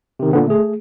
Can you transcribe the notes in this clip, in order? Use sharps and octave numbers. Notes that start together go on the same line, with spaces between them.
C3 D#3
A#2 D3 B3
A3 G#4